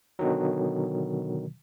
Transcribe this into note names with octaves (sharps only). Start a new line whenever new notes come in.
B2 D3 D#3 F#3